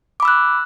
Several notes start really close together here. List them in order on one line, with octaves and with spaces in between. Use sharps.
D6 B5 E6 F#6